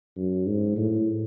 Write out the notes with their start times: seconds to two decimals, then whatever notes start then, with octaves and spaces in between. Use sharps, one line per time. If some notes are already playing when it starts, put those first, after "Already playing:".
0.17 F#2
0.47 G#2
0.76 A2